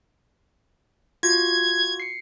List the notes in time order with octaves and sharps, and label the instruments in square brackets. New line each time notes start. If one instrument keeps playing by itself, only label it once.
[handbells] F4 F#4 [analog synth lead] G#6
[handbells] C7 C#7